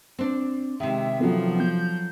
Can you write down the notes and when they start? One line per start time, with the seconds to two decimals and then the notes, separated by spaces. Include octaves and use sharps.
0.18 C4 D4
0.80 C3 D#3 G#3 E5
1.20 F3 F#3 B3 F4 A4
1.60 G6